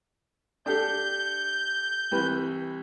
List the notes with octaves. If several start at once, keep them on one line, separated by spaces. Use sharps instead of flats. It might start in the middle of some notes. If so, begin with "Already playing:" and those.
D4 G4 A4 G6
C2 E3 B4